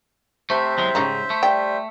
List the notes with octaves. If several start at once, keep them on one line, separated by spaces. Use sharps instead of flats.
C3 A3 C5 E5
E2 F#3 G#3
G#2 C#3 G3 C#4 D#4
A3
G3 G5